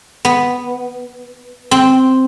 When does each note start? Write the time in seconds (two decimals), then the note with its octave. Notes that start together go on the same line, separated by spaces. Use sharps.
0.25 B3
1.71 C4